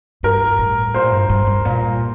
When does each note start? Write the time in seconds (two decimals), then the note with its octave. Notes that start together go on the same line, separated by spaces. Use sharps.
0.23 G2 A#4
0.59 A2
0.94 A#2 C5
1.11 G2
1.29 G2
1.47 G2
1.65 A#2